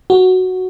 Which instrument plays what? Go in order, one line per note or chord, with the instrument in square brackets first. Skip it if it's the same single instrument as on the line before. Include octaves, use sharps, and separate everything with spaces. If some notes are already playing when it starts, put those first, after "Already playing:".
[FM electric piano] F#4